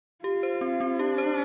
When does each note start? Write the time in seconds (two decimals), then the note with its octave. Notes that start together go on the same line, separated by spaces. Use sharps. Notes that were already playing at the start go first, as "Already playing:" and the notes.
0.24 F4 G4
0.43 C5
0.61 C4
0.80 C4
0.99 D4 G4
1.18 C5